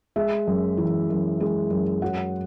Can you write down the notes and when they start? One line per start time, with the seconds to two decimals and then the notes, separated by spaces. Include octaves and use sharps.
0.16 G#3 E5
0.47 F#2
0.77 E3
1.10 F#2
1.40 G#3
1.70 F#2
2.02 F#3 F#5